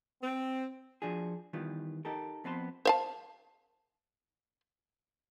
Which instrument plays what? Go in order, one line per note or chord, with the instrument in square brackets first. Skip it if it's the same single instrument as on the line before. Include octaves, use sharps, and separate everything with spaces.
[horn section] C4
[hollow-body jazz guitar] F3 D4 F#4 G#4
D#3 E3 G3 B3 F4
D#4 G4 A4 A#4
F2 B3 C4 B4 A5 C6
[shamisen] C5 F5 A5